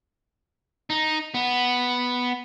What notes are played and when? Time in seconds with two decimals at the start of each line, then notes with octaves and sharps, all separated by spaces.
0.90 D#4
1.34 B3